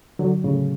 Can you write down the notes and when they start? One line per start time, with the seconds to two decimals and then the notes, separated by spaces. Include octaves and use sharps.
0.19 D3 F#3
0.44 A2 C#3